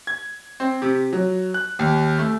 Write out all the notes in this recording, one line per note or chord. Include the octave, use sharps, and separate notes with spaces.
G#6
C4
C3
F#3
F#6
D#2
A3